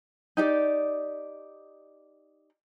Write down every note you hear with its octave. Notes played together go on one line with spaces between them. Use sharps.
D#4 G4 D5